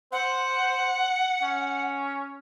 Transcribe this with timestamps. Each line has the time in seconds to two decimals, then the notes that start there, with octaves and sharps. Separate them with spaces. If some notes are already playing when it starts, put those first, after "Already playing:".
0.12 C5 F#5
1.42 C#4